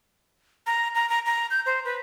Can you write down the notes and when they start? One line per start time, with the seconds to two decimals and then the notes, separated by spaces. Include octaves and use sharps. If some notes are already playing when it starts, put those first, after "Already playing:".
0.67 A#5
0.95 A#5
1.09 A#5
1.26 A#5
1.51 G6
1.66 C5
1.85 B4